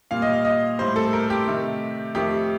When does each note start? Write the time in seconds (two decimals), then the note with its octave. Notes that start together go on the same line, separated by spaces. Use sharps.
0.11 A#2 G3 F5
0.22 D#5
0.33 F5
0.45 D#5
0.79 A2 G3 C5
0.96 A4
1.13 A#4
1.30 G4
1.48 C3 D#3 A3
2.15 F2 D#3 A3 G4